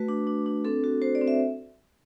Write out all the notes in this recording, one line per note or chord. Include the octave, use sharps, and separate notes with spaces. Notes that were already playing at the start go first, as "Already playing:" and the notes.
Already playing: A3 F#4 B4
D4
D4
D4
C4 A4
F#4
F#4 C5
D5
C4
E5